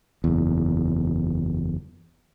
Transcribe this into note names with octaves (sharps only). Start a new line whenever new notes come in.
F#1 E2